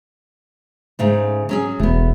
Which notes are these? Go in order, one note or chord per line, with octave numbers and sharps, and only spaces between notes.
G#2 C#3 A3
F#3 C#4 G#4
E1 A3 B3